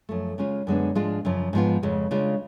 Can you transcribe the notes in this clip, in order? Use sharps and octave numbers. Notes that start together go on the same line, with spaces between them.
F#2 F3 A3
C#3 G#3 C#4 F4
F#2 D3 G#3 B3 D4
G#2 F3 G#3 D4 F4
F#2 C#3 F3
G#2 F3 B3 F4
F2 C#3 G#3
C#3 G#3 D4 F4